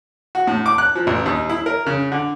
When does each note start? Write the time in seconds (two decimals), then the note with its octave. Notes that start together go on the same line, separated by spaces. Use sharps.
0.35 F#4
0.47 A2
0.66 D6
0.78 F#6
0.95 F3
1.07 A1
1.26 D#2
1.49 E4
1.66 A#4
1.86 C#3
2.12 D3